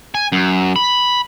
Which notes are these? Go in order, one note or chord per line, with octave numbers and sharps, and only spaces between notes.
G#5
F#2
B5